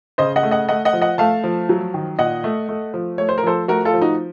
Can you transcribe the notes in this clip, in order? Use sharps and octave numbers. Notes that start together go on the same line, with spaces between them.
C#3 C5 D#5
D#5 F#5
A3
D#5 F#5
A3 D#5 F#5
D#5 F#5
F3
D#5 F#5
A3 F5 A5
F3
F#3
D#3
A#2 D#5 F#5
A3
A3
F3
A3 C#5
C5
A#4
F3 A4 C5
A3 F#4 A#4
F4 A4
F3
D#4 F#4